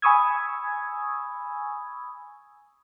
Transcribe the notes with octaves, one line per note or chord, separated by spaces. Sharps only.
G#5 B5 C#6 D#6 E6 G#6